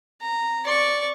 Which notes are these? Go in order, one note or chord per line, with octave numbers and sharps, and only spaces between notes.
A#5
D5 C#6